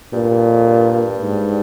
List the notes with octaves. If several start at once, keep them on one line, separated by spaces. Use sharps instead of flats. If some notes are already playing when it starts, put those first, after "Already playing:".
G2 A#2
G2
F2
G2
G#2